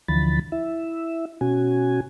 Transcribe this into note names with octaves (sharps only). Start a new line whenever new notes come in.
D2 D3 E3 F3 B5 A6
E4 E5
B2 C#4 F#4 G#5